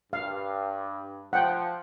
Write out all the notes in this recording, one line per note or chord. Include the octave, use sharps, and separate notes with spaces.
G2 F5
F3 F#5 G5